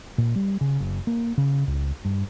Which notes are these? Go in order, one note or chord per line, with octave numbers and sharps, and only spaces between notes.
A#2
G3
C#3
F#1
A#3
C#3
C#2
G2